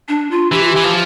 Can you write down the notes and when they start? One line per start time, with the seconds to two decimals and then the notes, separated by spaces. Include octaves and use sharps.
0.08 D4
0.31 F4
0.52 E3 G4
0.64 F4
0.73 E3 G4
0.84 F3